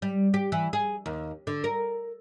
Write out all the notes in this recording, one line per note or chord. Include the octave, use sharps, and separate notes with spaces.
G3
G4
E3
G#4
D#2
D3
A#4